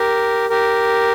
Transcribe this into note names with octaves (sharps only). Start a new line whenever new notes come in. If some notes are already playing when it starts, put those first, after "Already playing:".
Already playing: G4 A#4
G4 A#4